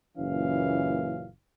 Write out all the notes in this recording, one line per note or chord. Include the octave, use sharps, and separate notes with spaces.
F#1 A#2 E3 C#4 F5